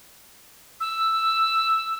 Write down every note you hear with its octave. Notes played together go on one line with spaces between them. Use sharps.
E6